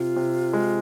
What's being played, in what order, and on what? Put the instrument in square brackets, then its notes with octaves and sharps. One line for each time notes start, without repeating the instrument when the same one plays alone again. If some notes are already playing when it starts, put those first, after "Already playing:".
Already playing: [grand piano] C3 [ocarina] F4
[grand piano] C3
G#3